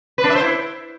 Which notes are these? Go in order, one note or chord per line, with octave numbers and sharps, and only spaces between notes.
B4
D4
E5
C5
E4